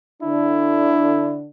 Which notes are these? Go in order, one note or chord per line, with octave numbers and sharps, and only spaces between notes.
D3 D4 E4